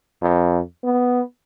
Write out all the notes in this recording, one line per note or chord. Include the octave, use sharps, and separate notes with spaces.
F2
B3